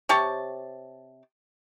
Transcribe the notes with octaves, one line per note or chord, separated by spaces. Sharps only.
C3 G4 C#5 A5